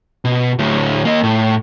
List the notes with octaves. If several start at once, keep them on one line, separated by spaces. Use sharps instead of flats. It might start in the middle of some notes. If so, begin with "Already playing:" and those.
B2
D2 A2
A#3 D#5
A2